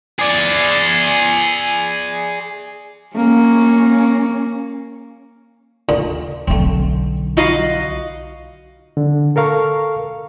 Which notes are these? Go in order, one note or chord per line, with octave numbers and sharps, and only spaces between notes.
G#4 D5
A#3 C#4
D2 A#2 D3
B1 D3 A3 C4
D#4 F4 F#4 D#5 F5 B5
D3
A4 A#4 F5 C#6